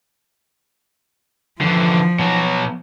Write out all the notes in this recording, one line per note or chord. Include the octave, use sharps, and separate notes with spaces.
D3 E3 F3
B2 F#3